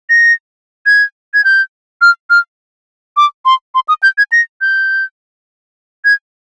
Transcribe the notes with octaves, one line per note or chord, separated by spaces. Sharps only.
A#6
G#6
G#6
G6
F6
F6
D6
C6
C6
D#6
G6
G#6
A#6
G6
G#6